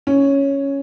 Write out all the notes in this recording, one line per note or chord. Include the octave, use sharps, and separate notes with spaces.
C#4